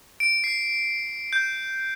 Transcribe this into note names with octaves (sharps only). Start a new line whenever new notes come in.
D7
C7
G6